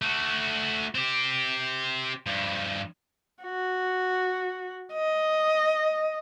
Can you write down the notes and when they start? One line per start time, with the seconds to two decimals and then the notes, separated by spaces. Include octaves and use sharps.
0.02 A3 F#4
0.95 C4 G4
2.26 G2 F3
3.43 F#4
4.93 D#5